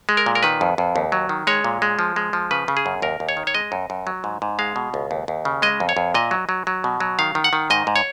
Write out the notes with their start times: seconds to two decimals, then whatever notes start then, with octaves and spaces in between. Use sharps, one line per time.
0.09 G#3
0.17 A#4
0.26 A#2
0.35 A#4
0.43 D#3 B4
0.61 F2
0.78 F2
0.96 D#2
1.12 F#3
1.29 D#3
1.47 G#3 C#5
1.64 A#2
1.82 G#3
1.99 F3
2.16 G#3
2.33 F3
2.51 C#3 B4
2.68 C#3
2.77 G#4
2.86 F#2
3.02 D#2 A#4
3.20 D#2
3.29 C#5
3.37 D#3
3.47 C#5
3.54 G#3 D#5
3.72 F#2
3.90 F#2
4.07 F#3
4.24 G#2
4.42 G#2
4.59 G#3 F5
4.76 B2
4.94 C#2
5.11 D#2
5.28 D#2
5.45 C#3
5.62 G#3 D#5
5.80 F2
5.89 C#5
5.97 F2
6.14 A#2 D#5
6.31 F#3
6.49 F#3
6.67 F#3
6.84 B2
7.00 F#3
7.19 D#3 F5
7.35 D#3
7.44 F#5
7.53 D#3
7.70 G#2 D#5
7.87 G#2
7.96 C#5